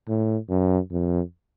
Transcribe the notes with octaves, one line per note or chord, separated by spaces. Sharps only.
A2
F#2
F2